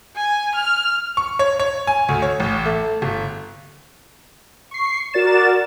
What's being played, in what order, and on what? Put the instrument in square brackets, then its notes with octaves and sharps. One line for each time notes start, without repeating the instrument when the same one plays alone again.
[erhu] G#5
F6
[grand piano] C#6
C#5
C#5
G#5
D2
C#5
A1
A3
G1
[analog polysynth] C#6 C7
F#4 A#4 D5 A6 E7